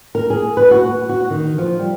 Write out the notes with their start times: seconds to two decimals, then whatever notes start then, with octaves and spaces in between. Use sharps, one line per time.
0.15 A#4
0.30 G#4
0.57 B4
0.71 F#4
0.89 B3
1.09 F#4
1.30 D#3
1.58 F3
1.79 G3